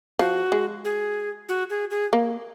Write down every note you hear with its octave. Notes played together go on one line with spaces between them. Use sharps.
F3 F#4
G#3
G#4
F#4
G#4
G#4
A#3